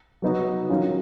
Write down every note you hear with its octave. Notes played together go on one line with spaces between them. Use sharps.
F#3 B3 D#4 F#4
D#3 F#3 C#4 F4